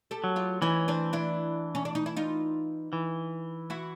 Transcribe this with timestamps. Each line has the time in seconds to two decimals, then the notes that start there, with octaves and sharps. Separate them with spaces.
0.11 G4 A4
0.24 F#3
0.36 F4 G4
0.62 E3 C#4 D#4
0.88 C4 D4
1.13 D4 E4
1.75 C#4
1.85 D4
1.95 D#4
2.06 E4
2.17 D#4 F4
2.93 E3
3.70 E4 F#4